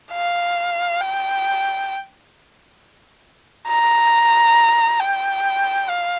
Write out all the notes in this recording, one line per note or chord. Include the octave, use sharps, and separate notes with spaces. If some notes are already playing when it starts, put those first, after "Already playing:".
F5
G5
A#5
G5
F5